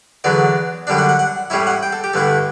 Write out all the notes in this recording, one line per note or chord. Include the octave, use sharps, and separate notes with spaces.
E2 D3 F#3 B3 D5
F#2 D3 G3 D4 D5
F#5
F#5
F#5
A2 G3 C#4 E4 E5
F#5
G5
A4
G4
G2 D3 A3 E4 A4